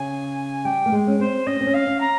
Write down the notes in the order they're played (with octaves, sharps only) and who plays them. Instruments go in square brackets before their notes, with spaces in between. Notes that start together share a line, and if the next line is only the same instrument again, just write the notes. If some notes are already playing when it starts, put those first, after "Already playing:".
Already playing: [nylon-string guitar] C#3 [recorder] G#5
[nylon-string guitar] G3 [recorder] G5
[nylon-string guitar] A#3
G#3
C#4
[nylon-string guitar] C4 [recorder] C5
[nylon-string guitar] C#4 [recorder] D#5
[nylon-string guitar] C4
C#4
[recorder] F5
[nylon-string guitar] C#4
[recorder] A#5